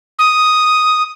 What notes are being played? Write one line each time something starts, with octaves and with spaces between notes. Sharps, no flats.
D#6